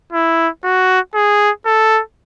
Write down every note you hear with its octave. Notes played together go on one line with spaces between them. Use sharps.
E4
F#4
G#4
A4